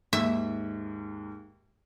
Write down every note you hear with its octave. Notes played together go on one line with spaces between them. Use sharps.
D#2 G#2 E5